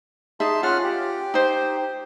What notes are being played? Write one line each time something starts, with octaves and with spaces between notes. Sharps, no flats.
D#4 G#4 E5 A5 C6
C#4 F4 F#5 F6
G4
D#4 C5